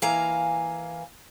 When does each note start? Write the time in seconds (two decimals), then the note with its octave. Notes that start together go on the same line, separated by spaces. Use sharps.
0.02 E3 A#3 F5 G#5 A#5